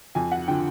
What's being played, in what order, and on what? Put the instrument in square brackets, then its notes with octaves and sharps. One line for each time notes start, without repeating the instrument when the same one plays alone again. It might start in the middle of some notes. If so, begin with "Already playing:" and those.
[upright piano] F2 G#5
F#5
D3 F3 G5